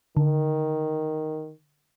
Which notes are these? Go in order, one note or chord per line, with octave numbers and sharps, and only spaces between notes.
D3 D#3